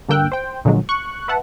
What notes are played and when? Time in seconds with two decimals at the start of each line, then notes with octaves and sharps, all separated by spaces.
0.09 G2 D3 A#3 G5 E6 F#6
0.32 C5 G5
0.65 A#2 D3 F3 F#3 G#3
0.89 C#6 F#6
1.28 B4 E5 F#5 A5